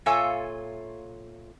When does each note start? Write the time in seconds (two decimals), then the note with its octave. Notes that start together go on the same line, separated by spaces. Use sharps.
0.06 A#2 F4 A4 C#5 E5 G#5